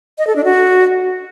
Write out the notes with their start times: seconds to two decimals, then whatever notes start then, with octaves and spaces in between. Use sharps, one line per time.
0.18 D#5
0.27 A4
0.36 D4
0.44 F#4